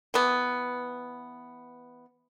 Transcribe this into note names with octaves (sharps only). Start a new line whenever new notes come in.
E3 B3